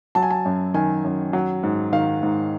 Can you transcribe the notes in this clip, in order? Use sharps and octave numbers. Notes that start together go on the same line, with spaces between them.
F#3 A5
G#5
A5
F#2
D#3 G#5
F#2
F#3
G#2
D#3 F5
G#2